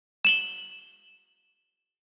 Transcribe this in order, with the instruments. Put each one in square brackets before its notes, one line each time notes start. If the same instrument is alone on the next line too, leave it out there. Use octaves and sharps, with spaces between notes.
[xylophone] E7 F#7 G7